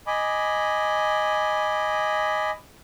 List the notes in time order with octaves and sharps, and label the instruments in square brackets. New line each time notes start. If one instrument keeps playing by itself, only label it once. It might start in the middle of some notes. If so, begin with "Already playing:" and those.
[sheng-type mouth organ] D#5 G#5 B5 D6